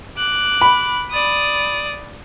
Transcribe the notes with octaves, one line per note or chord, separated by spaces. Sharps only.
D6 F#6
B5
D5 D#6